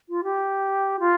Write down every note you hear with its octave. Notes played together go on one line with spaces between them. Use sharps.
F4
G4
F4